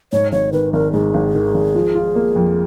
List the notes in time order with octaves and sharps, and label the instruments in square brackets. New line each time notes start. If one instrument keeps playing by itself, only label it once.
[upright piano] G#2 [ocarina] C#5
[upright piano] G#1 [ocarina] C#5
[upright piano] D#3 [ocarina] B4
[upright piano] G#1 [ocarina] A#4
[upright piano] G#2 [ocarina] G#4
[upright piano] G#1
D#3
G#1
F3
F4
A#3
F2